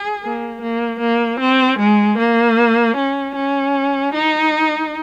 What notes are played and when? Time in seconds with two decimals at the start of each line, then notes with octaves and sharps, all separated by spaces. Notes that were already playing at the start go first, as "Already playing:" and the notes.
Already playing: G#4
0.23 A#3
0.62 A#3
1.00 A#3
1.40 C4
1.79 G#3
2.18 A#3
2.96 C#4
3.35 C#4
4.14 D#4